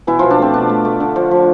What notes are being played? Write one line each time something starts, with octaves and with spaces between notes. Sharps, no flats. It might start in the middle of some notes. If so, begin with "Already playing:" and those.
B2 E3 E4
B2 F3 F4
D4
A3 C4
B2 D4
A3
A3
D3
F3
F3